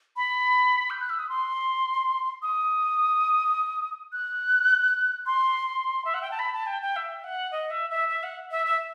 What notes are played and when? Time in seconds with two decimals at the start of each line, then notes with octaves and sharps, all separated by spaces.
0.17 B5
0.90 G6
1.00 F#6
1.10 E6
1.19 D#6
1.29 C6
2.42 D#6
4.12 F#6
5.26 C6
6.05 E5
6.14 F#5
6.22 G5
6.31 A5
6.39 B5
6.54 A5
6.67 G5
6.82 G5
6.96 E5
7.24 F#5
7.52 D#5
7.70 E5
7.90 E5
8.09 E5
8.23 F#5
8.51 E5
8.66 E5